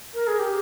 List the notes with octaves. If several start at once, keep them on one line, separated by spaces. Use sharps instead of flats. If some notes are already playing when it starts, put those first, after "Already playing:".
A#4
G#4
G4